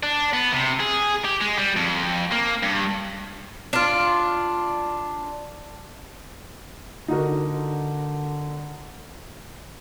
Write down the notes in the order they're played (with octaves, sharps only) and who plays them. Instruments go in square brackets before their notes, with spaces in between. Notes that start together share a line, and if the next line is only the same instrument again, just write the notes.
[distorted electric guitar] D4
B3
C3
G#4
G4
G#3
G3
F2
A#3
G2
[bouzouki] D4 F4
[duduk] D3 [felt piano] D#4 F#4 A#4